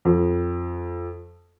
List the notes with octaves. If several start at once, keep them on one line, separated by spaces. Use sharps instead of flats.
F2